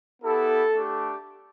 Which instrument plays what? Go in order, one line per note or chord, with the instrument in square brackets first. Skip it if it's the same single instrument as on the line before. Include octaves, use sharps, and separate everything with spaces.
[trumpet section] B3 E4 G4 A4
A3 D4 G4